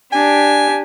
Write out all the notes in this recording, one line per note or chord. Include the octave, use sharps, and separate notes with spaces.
D4 G4 G#5